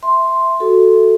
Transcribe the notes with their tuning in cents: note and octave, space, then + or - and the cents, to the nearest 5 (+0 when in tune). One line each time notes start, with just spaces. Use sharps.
E5 +0 C6 +0
F#4 +0 A4 +0